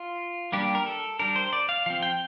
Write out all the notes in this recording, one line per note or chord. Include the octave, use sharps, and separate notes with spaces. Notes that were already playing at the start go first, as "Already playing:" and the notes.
Already playing: F4
G3 A#3 D4 G4
A#4
A4
G3 D4 A#4
C5
D5
F5
F3 C4 F5
G5